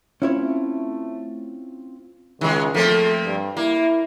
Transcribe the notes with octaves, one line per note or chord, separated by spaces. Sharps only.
A3 C4 C#4 E4 F4 C#5
C#2 D#3 G#3
F3 A3 A#3 C4
G2
A#3 E4